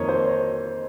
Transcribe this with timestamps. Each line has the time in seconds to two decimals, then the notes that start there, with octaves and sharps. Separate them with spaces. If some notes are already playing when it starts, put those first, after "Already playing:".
Already playing: F2 D#3 A#3 D#4 C#5 D#5
0.09 C5
0.24 C#5